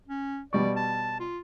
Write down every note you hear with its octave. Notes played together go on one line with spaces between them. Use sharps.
C#4
B2 G3 D5 C#6
A5
F4